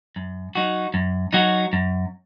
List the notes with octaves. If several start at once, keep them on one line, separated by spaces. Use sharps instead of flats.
F#2
F#3 D#4 F#4
F#2
F#3 D#4 F#4
F#2